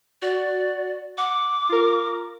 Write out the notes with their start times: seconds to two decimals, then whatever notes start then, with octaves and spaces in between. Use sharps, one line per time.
0.22 F#4 D5
1.18 F#5 D6
1.69 F4 A#4